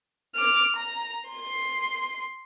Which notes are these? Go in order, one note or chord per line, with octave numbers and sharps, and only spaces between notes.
D6 F6
A#5
C6